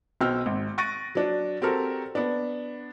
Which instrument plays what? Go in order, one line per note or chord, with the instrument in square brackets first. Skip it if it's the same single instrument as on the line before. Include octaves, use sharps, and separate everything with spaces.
[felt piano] B1 B2 C5 G5 E6 F6
G#1
C#6 F#6 A6 A#6 D7 D#7
F#3 D4
C4 F#4 G4 A4 A#4
B3 D4